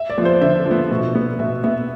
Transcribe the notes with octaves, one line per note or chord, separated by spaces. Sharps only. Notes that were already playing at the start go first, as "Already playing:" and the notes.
Already playing: E5
D5
F3 B3
C5
D3 E5
F3
B3
B2
B3
B2 E5
B3 E5